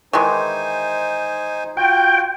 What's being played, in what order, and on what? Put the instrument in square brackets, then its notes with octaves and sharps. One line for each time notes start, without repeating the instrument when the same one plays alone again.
[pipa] D#3 E3 G#3 [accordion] D#4 C5 G#5
[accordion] F4 F#4 [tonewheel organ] G5